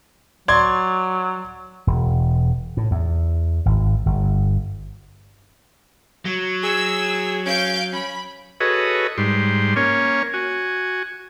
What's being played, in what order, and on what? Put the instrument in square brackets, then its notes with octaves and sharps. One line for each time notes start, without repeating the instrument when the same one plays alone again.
[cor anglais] F#3 [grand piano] D5 C6 G#6
[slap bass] E1
A2
E2
G#1
G1
[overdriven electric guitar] F#3
[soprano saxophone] G#4 [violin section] E6
[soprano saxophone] C#4 [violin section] F5 G6 D7
[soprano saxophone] C#4 [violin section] B5
[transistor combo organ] F#4 G#4 A4 B4 C#5 D#5
G#2 G3 C6
A#3 C#4 C#5
F#4 G#5